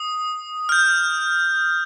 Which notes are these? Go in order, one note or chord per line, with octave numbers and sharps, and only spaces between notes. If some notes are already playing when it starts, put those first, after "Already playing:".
Already playing: D#6
F6
G6